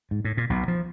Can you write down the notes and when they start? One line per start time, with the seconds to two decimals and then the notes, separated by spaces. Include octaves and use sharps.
0.11 G#2
0.25 A2
0.37 A#2
0.50 B1 B2
0.68 F3